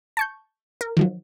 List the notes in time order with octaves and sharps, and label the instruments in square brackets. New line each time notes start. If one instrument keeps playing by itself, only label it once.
[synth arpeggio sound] A5 C#6 G6
A#4
D#3 F3 F#3